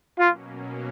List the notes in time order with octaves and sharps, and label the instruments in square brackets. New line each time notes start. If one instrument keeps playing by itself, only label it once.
[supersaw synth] B2 F#3 A#3 C#4 [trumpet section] F4